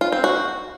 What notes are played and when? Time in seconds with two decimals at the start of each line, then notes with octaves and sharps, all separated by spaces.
0.01 F4
0.12 C4
0.24 F#4